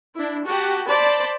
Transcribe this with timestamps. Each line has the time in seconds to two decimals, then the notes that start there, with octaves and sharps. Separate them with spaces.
0.15 D4 E4
0.47 F#4 G4 F#5 A5
0.86 C5 D5 A5 B5